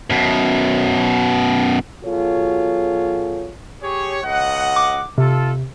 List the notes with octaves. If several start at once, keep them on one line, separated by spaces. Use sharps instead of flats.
F#2 B2
B2 F#3 F4 G#4 A4 C#5
G4 G#4 C#5
C#2 D#5 F#5
D6
C3 F4 A4